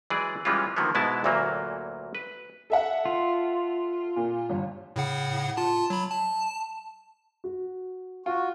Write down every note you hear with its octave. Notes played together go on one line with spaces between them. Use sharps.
E3 F#3 G#3 G#4 D5
E3 G3 G#3 C#4 F4
D3 D#3 F3 F#3 A#3 B3
G#2 B2 G#3 B3 E4 A5
D2 A#2 E3 F#3 A3 A#3
B4
A4 E5 F#5
F4
A#2
G1
A2 C#3 F#5
F4 A5
F#3 B5
A5
F#4
F4 F#4